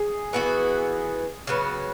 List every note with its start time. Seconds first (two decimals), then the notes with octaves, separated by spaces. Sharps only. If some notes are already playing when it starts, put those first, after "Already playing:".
Already playing: G#4
0.33 E3 B3 F#4
1.47 C#3 F#3 B3